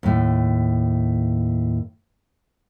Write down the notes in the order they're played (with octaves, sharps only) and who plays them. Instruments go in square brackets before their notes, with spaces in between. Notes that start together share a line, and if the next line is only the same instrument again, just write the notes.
[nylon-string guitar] D#2 A2